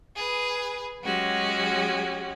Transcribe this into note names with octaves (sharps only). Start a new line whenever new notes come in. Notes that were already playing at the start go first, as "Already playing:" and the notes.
G#4 B4
F#3 G#3 C#4 F#4 G4